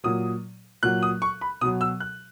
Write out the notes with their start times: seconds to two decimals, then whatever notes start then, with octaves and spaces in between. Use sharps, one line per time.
0.04 A#2 F#3 D#6
0.83 A#2 F#3 F#6
1.03 D#6
1.22 C#6
1.41 B5
1.61 B2 D#6
1.65 F#3
1.81 E6
2.00 F#6